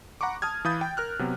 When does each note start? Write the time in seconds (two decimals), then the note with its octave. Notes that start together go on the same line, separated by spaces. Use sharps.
0.21 F#5 A#5 B5 C#6 D6
0.42 A5 D#6 F6 G#6
0.65 E3 F5 B5 D#6 G6 A6
0.81 G5
0.97 A#4 F6 F#6
1.19 C3 F#3 B3